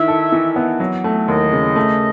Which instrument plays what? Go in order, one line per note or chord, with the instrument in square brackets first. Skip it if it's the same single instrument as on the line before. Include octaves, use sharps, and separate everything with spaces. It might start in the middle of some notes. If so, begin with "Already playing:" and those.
Already playing: [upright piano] D#3 E4 [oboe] E5
[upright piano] A4
E3
B3
F#3
A3
[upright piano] D#2 [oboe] D#5
[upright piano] C#3
A3